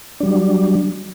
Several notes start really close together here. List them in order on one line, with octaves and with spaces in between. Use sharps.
D4 G3 F#3